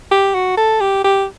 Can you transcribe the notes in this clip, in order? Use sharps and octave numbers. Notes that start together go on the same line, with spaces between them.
G4
F#4
A4
G4
G4